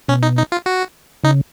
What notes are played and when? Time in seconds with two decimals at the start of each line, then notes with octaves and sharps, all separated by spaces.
0.08 B2 C#4
0.23 D#4
0.37 D#4
0.52 F4
0.66 F#4
1.24 C#3 D#4